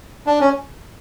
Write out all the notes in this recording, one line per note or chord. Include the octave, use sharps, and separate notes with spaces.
D4
C#4